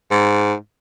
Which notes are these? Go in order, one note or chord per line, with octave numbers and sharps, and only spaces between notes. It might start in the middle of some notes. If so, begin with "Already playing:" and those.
G#2